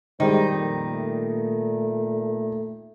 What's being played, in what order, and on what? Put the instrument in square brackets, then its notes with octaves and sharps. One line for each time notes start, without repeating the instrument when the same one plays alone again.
[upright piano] D#3 G3 [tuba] G#3 [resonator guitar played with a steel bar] D#4 [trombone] C5
[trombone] F2 [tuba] A#2
[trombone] A3